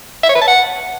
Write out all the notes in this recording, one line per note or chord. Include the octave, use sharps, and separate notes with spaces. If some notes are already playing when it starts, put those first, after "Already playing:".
E5
C#5
B4
A5
F#5